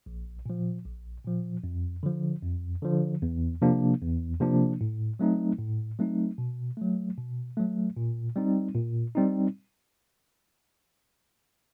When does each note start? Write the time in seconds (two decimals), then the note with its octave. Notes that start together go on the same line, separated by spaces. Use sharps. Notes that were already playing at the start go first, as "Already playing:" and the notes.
0.06 A#1
0.46 A#2 F3
0.85 A#1
1.25 A#2 F3
1.64 F2
2.03 D3 F3
2.43 F2
2.82 D3 F3
3.22 E2
3.62 C3 F3 A#3 D4
4.01 E2
4.40 C3 F3 A#3 D4
4.81 A2
5.19 F#3 A3 C4 D#4
5.59 A2
5.99 F#3 A3 C4 D#4
6.38 B2
6.77 F#3 A3
7.18 B2
7.57 F#3 A3
7.97 A#2
8.36 G3 C4 D#4
8.75 A#2
9.15 G3 C4 D#4